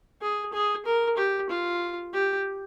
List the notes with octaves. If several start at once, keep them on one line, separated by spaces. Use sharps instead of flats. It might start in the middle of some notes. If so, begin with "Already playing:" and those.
G#4
G#4
A#4
G4
F4
G4